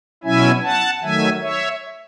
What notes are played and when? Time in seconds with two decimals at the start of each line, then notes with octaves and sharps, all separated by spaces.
0.23 B2 F#3 C#4 E4 E5 G#5
0.63 F#5 A5
1.01 D#3 F#3 A3 E5 G#5
1.41 C#5 E5